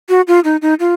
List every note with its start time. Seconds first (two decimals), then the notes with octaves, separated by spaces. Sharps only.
0.09 F#4
0.28 F4
0.44 D#4
0.62 D#4
0.80 F4